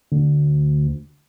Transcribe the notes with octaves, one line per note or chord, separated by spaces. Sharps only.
D2